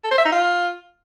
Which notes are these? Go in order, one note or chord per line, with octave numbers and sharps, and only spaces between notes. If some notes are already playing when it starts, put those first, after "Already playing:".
A4
C5
E5
D#4
F4